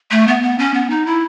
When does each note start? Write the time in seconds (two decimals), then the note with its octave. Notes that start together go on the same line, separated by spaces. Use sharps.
0.11 A3
0.28 B3
0.42 B3
0.59 C#4
0.74 B3
0.90 D#4
1.06 E4